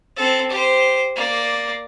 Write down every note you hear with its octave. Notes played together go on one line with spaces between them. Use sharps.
C4 A4
G4 C5
A#3 D5